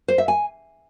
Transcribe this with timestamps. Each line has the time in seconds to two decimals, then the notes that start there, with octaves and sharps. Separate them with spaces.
0.08 C5
0.18 E5
0.28 G#5